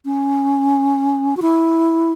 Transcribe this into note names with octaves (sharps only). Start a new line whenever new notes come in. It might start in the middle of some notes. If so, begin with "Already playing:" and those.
C#4
F#4
E4